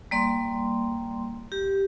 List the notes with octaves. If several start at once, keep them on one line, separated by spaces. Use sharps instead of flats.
G3 A#3 D5 C6
G4